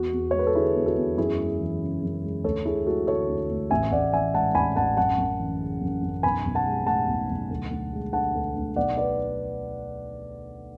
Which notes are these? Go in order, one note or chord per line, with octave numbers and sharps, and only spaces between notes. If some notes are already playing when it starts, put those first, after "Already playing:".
Already playing: E2 F#4
E2
G#3 C#5
B4
A4
D3 E4 G#4
E2
F#4 A4
E2
F#2 E4 G#4
G#3
E3
C#3
F#2
G#3
D2 A4 C#5
D2 E4 G#4
G#3 F#4 A4
D3 A4 C#5
D2
D2
A1 E5 G#5
A1 D5 F#5
E3 E5 G#5
G#2 F#5 A5
A1 G#5 B5
A1 F#5 A5
F#2 F#5 A5
F#2
E3
C#3
F#2
F#2
B1 G#5 B5
B1
F#5 A5
G#3
A2 F#5 A5
B1
B1
D2
D2
G#3
D3 F#5 A5
D2
D2
B1 D5 F#5
B4 D5